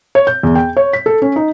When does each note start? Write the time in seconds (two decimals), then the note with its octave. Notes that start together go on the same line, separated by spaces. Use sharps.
0.15 C#5
0.27 G6
0.43 E2
0.55 G5
0.77 C#5
0.93 B6
1.06 A4
1.22 C#4
1.36 D#4